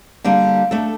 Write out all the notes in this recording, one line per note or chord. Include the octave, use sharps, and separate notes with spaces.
D3 G3 A#3 D4
A3 D4 A4